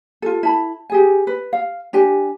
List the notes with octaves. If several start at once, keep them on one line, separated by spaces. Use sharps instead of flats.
F4 A4
E4 A5 B5
G4 G#4 G#5
B4
F5
D4 G4 G#5